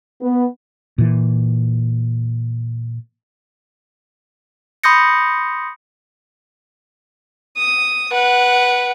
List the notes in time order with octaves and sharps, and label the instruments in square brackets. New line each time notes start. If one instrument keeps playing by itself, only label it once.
[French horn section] B3
[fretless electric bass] A#2 E3
[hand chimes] B5 C6 D#6 G6 A#6 C#7
[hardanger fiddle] D#6
B4 F#5